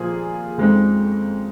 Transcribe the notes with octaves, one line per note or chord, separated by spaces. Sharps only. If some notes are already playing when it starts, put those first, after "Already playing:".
Already playing: A#2 F3 A#3 F4 G#4
F2 C#3 G#3 C4 D#4